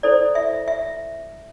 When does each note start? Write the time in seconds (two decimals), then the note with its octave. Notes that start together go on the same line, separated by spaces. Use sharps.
0.03 E4 A4 C5 D5
0.35 E5
0.68 E5